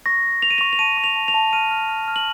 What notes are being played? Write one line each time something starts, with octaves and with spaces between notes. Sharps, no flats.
C#6 A#6
C#6
C#6 F7
D#7
C#6 F7
F7
A5 D#7
C#6
F7
A5
F7
A5
F6 D#7
F6
F6
F6
F#7